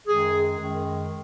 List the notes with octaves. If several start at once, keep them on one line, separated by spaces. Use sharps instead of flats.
F#2 D#3 G#3 G#4
F#2 D#3 G#3